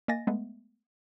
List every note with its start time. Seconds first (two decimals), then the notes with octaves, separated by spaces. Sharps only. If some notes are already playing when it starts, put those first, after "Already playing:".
0.08 A#3 D#5 G#5 A6 A#6
0.27 G#3 A3 B3